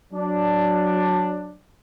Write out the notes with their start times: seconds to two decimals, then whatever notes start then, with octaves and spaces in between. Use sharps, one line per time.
0.12 F#3 D4